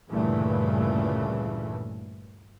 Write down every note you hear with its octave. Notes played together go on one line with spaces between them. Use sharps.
D2 G2 A#2 C#3 E3 A3